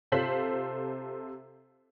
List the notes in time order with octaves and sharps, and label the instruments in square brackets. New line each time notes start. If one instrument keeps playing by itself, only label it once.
[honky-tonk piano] C3 F4 A4 C5 B6 F#7